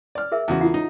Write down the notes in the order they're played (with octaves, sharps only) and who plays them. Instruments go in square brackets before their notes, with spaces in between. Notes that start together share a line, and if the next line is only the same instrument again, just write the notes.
[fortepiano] D5 F6
[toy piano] G#4 A#4 E5
[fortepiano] E2 C#3 F#4
[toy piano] E4 F4 F#5
[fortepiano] D#4